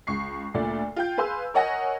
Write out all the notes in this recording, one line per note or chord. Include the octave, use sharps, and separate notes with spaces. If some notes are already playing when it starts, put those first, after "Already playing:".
C#2 C#6 C7
D2 A#2 A3 D5
F4 G5 G6
G#4 B4 F5 G#5 C6 E6
A#4 C#5 D#5 F#5 G#5 A#6